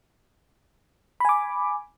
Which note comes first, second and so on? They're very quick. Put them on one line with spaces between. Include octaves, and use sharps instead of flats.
B5 G#5 D6